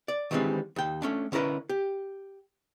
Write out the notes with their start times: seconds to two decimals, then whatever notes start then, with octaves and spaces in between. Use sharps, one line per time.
0.08 D5
0.31 D#3 E3 G3 G#3 C4 D4
0.76 D#2 G5
1.02 A3 C#4 D4
1.32 D3 C#4 E4 A#4 B4
1.69 G4